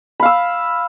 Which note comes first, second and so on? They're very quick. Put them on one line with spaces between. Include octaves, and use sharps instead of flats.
B5 F5 E6